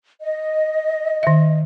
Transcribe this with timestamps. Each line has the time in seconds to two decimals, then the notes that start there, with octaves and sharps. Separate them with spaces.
0.21 D#5
1.23 D#3 E5